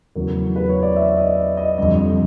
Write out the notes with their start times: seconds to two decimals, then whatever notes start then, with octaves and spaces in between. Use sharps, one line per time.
0.15 E2 C#3 F#3 A3 A#4
0.56 B4
0.69 C#5
0.83 D5
0.96 E5
1.17 D#5
1.57 D#5
1.78 F2 D3 G3 D#5